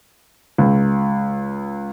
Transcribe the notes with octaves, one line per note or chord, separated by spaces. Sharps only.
C#2